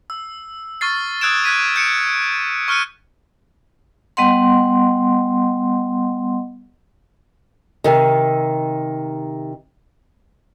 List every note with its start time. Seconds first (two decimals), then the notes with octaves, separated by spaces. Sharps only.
0.10 E6
0.81 C#6 F6 A6 C7
1.21 D#6 E6 F#6 G#6 D7 E7
1.44 F#6 G#6 B6 D#7
1.76 G6 C#7 D7 E7
2.68 C#6 F6 F#6 C#7 D#7
4.17 G3 B3 D#5 F#5 C6
7.84 C3 D#3